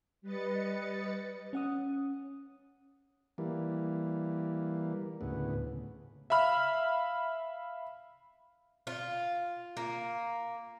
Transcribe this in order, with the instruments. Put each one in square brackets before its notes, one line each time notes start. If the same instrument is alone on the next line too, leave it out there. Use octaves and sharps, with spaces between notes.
[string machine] G3 B4 D#5 A6 C#7
[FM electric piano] C#4 F#5 D#6
[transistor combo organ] E3 G3 A#3
D2 A2 C#3 B3
[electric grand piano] E5 F5 B5 F6
[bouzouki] F4
A#3